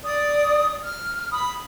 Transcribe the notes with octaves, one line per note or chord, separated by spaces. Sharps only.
D5 D#6
F6
B5 D#6